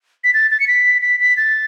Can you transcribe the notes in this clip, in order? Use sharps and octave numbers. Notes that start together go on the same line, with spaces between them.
B6
A6
A6
C#7
B6
B6
B6
A6